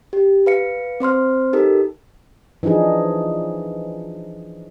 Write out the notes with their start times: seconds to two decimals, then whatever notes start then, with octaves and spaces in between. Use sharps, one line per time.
0.13 G4
0.46 B4 F5 C#7
1.00 C4 C5 C6 F6
1.53 D#4 G4 A4 A#4
2.63 E3 F3 D4 D#4 G#4